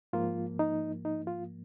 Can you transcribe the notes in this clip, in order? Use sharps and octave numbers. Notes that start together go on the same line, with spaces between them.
G#2 F3 A#3 F4
D#4
D#4
F4